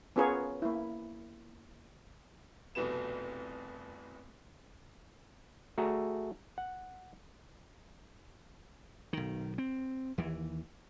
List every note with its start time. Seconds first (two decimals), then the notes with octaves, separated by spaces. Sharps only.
0.16 B3 C#4 F4 G#4 A#4 C#5
0.62 A#3 E4
2.75 F1 C2 B2 B3 E7
5.78 A3 F#4 G#4 A#5
6.58 F#5
9.13 B1 D#3
9.58 C4
10.18 D#2 E3